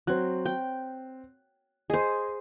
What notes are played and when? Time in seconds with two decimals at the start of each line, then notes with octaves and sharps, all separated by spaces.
0.07 F#3 C4 F#6
0.46 G5
1.90 G#4 C5 D#5 G#5